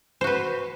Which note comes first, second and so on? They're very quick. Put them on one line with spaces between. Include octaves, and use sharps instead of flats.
C5 F#4 B4